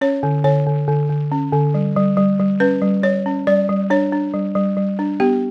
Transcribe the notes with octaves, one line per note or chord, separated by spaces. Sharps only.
C#4 C#5
D3
D3 C#5
D3
D3
D3
C#4
D3
G3
G3
G3
G3
C#4 B4
G3
G3 C#5
C#4
G3 D5
G3
D4 C#5
D4
G3
G3
G3
D4
B3 G4